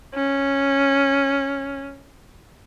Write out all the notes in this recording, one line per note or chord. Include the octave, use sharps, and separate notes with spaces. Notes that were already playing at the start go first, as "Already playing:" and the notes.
C#4